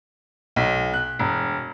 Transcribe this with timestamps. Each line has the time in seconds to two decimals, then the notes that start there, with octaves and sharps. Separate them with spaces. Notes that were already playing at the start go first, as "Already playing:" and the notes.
0.56 B1
0.93 F#6
1.19 E1